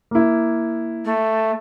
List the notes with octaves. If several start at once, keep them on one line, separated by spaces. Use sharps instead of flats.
A#3 E4
A3